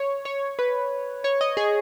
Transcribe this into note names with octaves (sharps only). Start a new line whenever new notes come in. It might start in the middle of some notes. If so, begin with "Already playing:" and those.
Already playing: C#5
C#5
B4
C#5
D#5
G#4